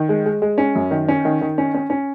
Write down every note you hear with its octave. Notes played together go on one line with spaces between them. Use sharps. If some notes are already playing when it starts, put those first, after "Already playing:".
Already playing: D#3
G#3
G#3
G#3
C#4
F#2
D#3
C#4
D#3
D#3
C#4
C#4
C#4